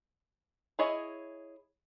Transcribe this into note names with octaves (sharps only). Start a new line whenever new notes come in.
E4 G#4 C#5 D#5